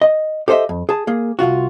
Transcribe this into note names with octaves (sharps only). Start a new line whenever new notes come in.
D#5
G4 A4 C5 D#5 E5
F2
G#4 A5
A#3 G#4
C2 F2 F4 F#4